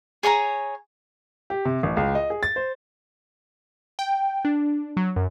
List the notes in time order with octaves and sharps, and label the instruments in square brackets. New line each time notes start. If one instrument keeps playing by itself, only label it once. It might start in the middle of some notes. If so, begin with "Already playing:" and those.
[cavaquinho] G#4 C#5 G#5 A#5
[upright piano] G4
C3
A1
C#2
D#5
G#4
A6
C5
[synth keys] G5
D4
F#3
F#2